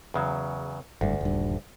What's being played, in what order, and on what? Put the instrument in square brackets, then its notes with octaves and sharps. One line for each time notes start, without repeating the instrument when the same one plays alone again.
[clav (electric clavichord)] E2 C#3 F#3
[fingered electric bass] F#1 G2 [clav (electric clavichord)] D2
[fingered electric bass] D#1 G2